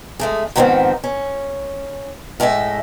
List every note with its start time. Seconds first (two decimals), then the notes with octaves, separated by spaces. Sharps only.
0.20 G#3 A3 G#4
0.56 G#2 D#3 F3 G3 B3 C4
1.04 C#4
2.40 A2 G#3 A3 D#5 E5